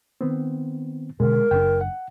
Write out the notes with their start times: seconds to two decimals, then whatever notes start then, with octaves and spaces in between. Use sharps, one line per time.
0.21 D#3 B3 C4
1.20 B2 D3 G#3 A#4
1.51 F#1 A#2 D4 G5
1.81 F#5